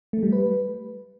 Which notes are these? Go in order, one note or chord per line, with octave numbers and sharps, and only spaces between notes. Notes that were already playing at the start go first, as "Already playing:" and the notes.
A3
G3
B4